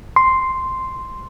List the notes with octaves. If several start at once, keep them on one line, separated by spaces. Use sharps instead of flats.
C6